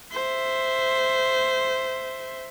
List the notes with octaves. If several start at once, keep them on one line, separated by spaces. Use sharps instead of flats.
C5 E5